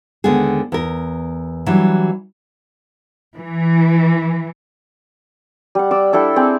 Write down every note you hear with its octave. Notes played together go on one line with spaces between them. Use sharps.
D#2 D3 G#3 B3 G#4
E2 A#4
E3 F#3 G3 D4
E3
G3 F#5
D5 D6 E6
D4 E4 A4 G5
C4 G#4